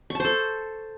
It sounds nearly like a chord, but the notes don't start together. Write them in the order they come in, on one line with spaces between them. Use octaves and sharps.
C#6 A5 C5 A4